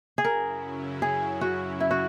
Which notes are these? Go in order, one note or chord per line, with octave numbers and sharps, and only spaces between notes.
G#4
F#2 C#3 F#3 C#4 E4 A#4
G#4
F#4
E4
F#4